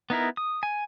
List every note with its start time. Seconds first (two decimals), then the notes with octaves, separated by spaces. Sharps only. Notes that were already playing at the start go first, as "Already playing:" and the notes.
0.10 B3 D#4 E4 A#4
0.37 D#6
0.63 G#5